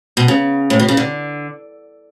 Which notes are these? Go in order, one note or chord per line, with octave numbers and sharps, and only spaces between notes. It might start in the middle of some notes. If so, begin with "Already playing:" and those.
B2
C#3
A2
B2
C#3
D3